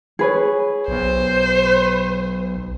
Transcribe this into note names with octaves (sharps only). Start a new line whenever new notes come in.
G#4 B4 C#5
B1 C5